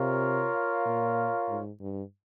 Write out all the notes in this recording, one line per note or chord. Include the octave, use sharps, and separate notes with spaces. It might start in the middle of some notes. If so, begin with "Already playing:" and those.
Already playing: C3 F4 A#4 C#5 F5
A#2
G#2
G2